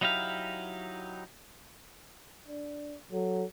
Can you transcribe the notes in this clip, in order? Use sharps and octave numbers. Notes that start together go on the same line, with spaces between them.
F#3 D#4 E4 G4 F5
D4
F#3 A4